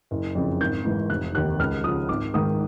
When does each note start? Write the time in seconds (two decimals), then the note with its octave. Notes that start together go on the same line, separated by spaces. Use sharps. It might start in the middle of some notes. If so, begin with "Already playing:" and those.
0.11 F#1
0.35 F2 C#3
0.60 G#1 G6
0.85 G#2 E3
1.10 F1 F#6
1.35 D#2 D#3 F#6
1.59 C#2 F6
1.84 C#3 F3 D#6
2.09 G#1 D6
2.34 G#2 D#3 D#6